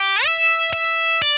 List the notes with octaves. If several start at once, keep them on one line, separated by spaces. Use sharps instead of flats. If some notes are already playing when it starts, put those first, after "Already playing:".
Already playing: G4
E5
E5
D5